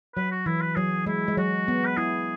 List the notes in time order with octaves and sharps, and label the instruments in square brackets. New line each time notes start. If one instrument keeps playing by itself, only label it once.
[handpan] F#3 [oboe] B4
[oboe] F#4
[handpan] E3 [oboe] E4
[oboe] B4
[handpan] F#3 [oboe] G#4
[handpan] G#3 [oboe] E4
[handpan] G#3
[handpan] F#3 [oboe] F#4
[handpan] B3
[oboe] B4
[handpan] E4 [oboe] G#4